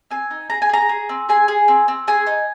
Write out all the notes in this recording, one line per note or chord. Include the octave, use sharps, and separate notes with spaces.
C4 G#5
D#4
G#4 A#5
G#5
G#4 A#5
G#4
C4
G#4 G#5
G#4
C4
C4
G#4 G#5
D#4